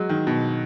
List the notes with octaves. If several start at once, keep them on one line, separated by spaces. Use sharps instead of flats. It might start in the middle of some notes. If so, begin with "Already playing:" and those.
Already playing: F#3 G#3
D#3
B2